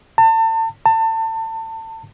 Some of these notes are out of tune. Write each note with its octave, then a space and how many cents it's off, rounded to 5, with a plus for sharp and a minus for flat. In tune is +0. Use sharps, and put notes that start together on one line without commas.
A5 +35
A5 +30